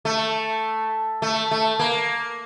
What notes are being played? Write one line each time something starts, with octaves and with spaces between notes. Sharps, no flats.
A3
A3
A3
A#3